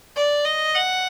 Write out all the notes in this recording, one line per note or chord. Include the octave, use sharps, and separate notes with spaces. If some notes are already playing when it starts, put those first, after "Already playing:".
D5
D#5
F#5